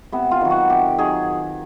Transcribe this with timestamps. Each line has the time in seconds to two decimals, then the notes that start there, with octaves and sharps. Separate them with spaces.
0.12 C3 B3
0.31 F4
0.41 D#3 F#3
0.51 F#4
0.70 C3 G4
0.98 D#3 F#3 G#4